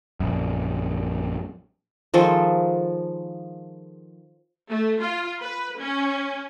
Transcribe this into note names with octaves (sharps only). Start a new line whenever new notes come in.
A#1 F#2
D#3 F3 G#3 A4
A3
F4
B4
C#4